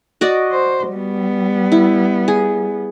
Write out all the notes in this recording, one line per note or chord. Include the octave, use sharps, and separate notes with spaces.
F#4 D5 D#5
C5
G3 B3
E4
G#4